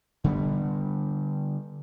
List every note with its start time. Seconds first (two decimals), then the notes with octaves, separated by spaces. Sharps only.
0.24 D3 G3 B3